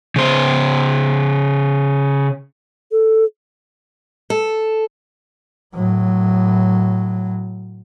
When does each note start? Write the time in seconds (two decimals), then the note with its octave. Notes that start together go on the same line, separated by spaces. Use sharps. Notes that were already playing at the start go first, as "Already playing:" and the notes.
0.16 C#3 C5
2.92 A4
4.30 A4
5.74 A2 F#3